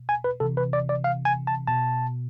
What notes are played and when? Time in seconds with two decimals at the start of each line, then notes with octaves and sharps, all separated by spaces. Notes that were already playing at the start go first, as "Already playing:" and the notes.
Already playing: B2
0.09 G#5
0.24 B4
0.40 C3 E3 A4
0.57 B4
0.73 D5
0.89 D5
1.04 F5
1.25 G#5
1.47 A5
1.67 B2 A5